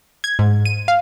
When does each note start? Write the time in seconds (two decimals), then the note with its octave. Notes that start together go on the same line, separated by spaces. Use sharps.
0.24 G#6
0.39 G#2
0.65 D#7
0.88 F5